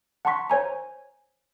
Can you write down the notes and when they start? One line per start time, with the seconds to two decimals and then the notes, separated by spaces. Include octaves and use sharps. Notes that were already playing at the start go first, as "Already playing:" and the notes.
0.25 F#5 A5 A#5 C6 C#6 B6
0.50 C5 C#5 G#5 A#5